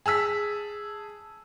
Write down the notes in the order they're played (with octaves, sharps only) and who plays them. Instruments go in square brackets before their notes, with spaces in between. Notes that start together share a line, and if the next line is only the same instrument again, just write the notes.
[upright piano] G#4 A5 E6 B6